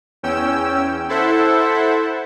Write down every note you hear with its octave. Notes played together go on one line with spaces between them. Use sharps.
E2 C#4 G5 E6
E4 A4 C5 E5 F#5